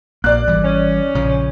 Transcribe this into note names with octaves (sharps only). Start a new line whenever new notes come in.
A#1 A#3 D5 F#6
G#1 E3 G3
C#4
A#1 C#3 F3